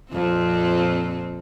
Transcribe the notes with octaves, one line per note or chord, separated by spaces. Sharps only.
F2 A#2 C4